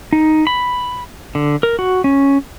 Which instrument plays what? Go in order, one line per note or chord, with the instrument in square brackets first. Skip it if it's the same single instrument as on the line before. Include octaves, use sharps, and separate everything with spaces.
[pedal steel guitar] D#4
B5
D3
A#4
F#4
C#4